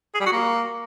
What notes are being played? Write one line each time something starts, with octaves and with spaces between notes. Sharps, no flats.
G#4
G3
F#4
A#3